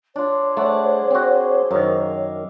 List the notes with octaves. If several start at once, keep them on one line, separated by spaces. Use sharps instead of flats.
D4 F4 C#5
A3 G#4 C5 D5 F#5
C4 F#4
F#2 D#3 A#4 E5 F5